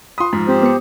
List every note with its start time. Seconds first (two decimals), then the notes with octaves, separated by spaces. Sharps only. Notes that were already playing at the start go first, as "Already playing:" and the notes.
0.18 F4 B5 C6 D#6
0.33 G#2 F3
0.48 C4 G4 C5
0.63 B3 C#7